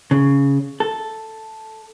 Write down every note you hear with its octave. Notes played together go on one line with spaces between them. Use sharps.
C#3
A4